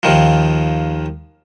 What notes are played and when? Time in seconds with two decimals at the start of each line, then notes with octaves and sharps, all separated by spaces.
0.03 D#2 D#3 F3